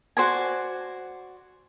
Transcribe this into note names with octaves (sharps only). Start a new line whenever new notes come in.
F#4 C5 D5 G#5